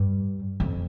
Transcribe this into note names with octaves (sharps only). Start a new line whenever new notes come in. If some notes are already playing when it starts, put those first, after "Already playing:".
Already playing: G2
F2